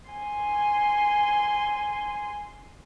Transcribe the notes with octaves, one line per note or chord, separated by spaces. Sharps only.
G#5 C6